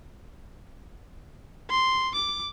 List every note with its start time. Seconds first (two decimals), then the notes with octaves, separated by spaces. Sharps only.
1.70 C6
2.15 D6